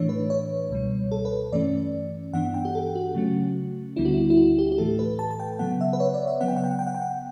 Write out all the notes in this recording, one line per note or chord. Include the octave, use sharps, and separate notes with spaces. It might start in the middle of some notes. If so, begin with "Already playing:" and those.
Already playing: A2 E3 A3 D4 C#5
B4
C#5
C#2 B2 G3
A4
B4
G2 E3 A3 C#4 D5
G2 E3 B3 D4 F#5
G5
G4
A4
F#4
C#3 F#3 A3 C#4
D2 D3 G3 B3 D4 E4
F#4
E4
E4
F#4
G4
G4
A2 E3 A3 A4
B4
A5
A5
G5
C#3 F#3 B3 F#5
E5
B4
C#5
D5
E5
C#3 F#3 B3 F#5
G5
F#5
G5
F#5
G5
F#5
G5
F#5